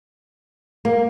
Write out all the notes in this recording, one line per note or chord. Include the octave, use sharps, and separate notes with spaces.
A#3